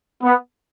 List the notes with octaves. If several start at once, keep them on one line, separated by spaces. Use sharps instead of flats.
B3